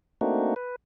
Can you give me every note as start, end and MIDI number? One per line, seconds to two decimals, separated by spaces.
0.21 0.54 57
0.21 0.54 58
0.21 0.54 60
0.21 0.54 62
0.21 0.54 63
0.21 0.54 66
0.56 0.76 71